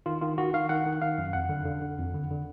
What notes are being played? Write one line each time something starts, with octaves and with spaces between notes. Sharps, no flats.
D#3 F4
D#3 F4
D#3 F#4
D#3 F5
D#3 F#5
D#3
D#3 F5
F#2
F2 F#5
D3
D3
D3
F2
D3
D3